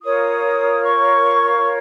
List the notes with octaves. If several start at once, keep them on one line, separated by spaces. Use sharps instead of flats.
F4 A#4 C#5 D#6
C#6